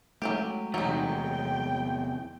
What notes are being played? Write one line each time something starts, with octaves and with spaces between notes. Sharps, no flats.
F#3 G#3 A3 C#4 G4
E2 C3 F#3 D#4 G5